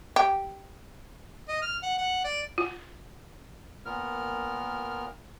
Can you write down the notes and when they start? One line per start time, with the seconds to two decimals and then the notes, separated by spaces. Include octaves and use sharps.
0.16 G4
1.48 D#5
1.62 F6
1.83 F#5
1.98 F#5
2.24 D5
2.58 F4
3.86 A#2 B3 A#4 F6